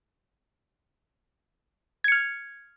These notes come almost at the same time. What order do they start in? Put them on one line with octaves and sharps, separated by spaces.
G#6 C#7 F6